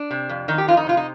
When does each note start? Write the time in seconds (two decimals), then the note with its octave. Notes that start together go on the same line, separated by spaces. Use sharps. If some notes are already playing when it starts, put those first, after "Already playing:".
Already playing: D4
0.11 C3
0.29 F2
0.48 D#3 D#4
0.58 G4
0.68 F2 F4
0.77 D#4
0.87 C3 F4
0.97 D#4